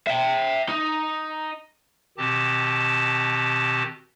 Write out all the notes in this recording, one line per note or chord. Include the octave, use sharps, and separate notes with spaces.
E5 G5
D#4
B2 D#3 C4 G4 A5